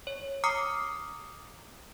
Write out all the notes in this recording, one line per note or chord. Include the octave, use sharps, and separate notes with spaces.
C#5
A#5 D6 D#6 F6 C7 C#7